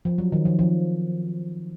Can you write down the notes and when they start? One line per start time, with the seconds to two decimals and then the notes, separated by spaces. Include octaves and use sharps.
0.05 F3
0.18 F#3
0.32 D#3
0.45 F3
0.59 F3